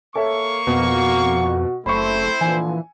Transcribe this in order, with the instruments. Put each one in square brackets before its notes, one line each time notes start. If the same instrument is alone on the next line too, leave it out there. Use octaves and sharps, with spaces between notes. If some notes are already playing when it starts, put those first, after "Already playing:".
[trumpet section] A#3 C#6 [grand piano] A4 C#5 E5
[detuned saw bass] F2 [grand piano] B2 [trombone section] F#4
[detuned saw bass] F#1 [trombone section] A3 [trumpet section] C4 E4 C5 [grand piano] B5 C#6
[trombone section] A#2 D3 F3 [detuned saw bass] E3 [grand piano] G#5